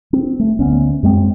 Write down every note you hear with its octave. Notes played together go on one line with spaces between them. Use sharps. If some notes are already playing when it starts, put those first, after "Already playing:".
C4
A3
D2 B3 C#4
F#2 G#3 A3 C4